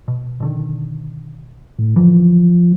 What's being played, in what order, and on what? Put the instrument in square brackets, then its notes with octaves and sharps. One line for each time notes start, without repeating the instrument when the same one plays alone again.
[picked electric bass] B2
B2 D3 D#3
[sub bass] A2
[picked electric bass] F#2 D3 E3 [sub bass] F3